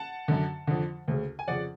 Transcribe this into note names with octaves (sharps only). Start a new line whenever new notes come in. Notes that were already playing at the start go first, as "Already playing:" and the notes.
Already playing: F#5 A5
F#2 D3
F2 D3
D2 C#3
G#5
F2 C#3 D5 F#5